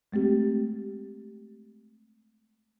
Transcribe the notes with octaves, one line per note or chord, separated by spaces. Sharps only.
G#3 A3 C4 G4